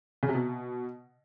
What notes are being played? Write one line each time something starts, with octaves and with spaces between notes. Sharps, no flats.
C#3
C3
B2